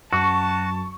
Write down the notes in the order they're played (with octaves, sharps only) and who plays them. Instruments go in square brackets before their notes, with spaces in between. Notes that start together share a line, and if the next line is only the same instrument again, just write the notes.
[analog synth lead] F#2 [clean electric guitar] F#4 [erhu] A5 [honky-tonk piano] C#6